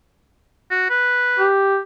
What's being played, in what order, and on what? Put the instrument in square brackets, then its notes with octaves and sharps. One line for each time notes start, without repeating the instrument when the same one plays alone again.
[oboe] F#4
B4
[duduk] G4